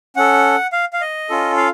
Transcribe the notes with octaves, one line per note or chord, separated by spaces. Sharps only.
C#4 A4 F#5
F5
F5
D#5
C#4 F4 A4
F5